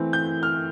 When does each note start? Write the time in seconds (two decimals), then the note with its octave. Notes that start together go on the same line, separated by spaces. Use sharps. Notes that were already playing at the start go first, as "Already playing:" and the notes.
Already playing: E3 A3 C4 E4
0.13 G6
0.43 F6